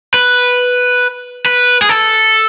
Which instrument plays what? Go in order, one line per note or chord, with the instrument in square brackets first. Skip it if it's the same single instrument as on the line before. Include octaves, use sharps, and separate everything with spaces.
[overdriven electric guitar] B4
B4
G#4
A4